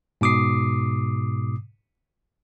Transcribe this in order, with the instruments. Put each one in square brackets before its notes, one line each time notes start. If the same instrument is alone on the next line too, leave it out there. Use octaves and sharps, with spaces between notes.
[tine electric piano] G#2 B2 D6 D#6 C7